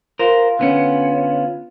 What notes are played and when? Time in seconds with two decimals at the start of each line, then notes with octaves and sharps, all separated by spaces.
0.19 F4 A#4 C5
0.59 D3 B3 C#4